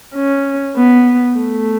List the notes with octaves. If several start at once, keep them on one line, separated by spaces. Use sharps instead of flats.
C#4
B3
A3